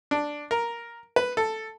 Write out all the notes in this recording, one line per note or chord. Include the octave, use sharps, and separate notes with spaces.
D4
A#4
B4
A4